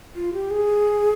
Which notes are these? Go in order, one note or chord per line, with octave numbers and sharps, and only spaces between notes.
F4
G4
G#4